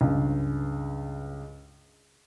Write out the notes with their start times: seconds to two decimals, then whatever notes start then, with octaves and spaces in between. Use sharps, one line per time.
0.01 C#2 G2